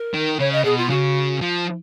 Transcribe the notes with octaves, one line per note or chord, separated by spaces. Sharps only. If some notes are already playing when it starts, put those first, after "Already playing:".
Already playing: A#4
D#3
C#3 C#5
D#5
B2 G#4
F4
C#3 F#4
F3